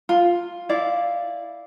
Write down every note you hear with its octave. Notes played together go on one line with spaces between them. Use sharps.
F4
E4 D5 F5